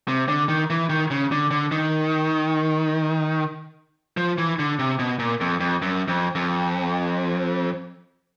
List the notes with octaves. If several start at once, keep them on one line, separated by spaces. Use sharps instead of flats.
C3
D3
D#3
E3
D#3
C#3
D3
D3
D#3
F3
E3
D3
C3
B2
A#2
F2
F2
F#2
F2
F2